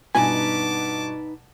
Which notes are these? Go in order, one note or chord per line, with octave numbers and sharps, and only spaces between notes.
G2 B2 D#4 E4 B4 G#5 A5 D6